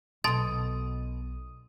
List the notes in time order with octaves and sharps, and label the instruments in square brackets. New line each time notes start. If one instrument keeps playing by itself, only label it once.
[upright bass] B1 [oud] B2 A4 [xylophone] A5 C6 A6 [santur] D#6